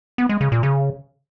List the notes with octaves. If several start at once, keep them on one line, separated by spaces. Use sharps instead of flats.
B3
G#3
C#3
A#2
C#3